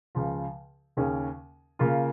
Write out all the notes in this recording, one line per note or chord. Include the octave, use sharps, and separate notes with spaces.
C#2 C#3 F3
D#2 C#3 A#3 C#4 G#4
C#3 A#3 F4